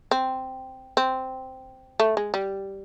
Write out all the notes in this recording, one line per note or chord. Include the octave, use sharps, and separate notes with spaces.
C4
C4
A3
G#3
G3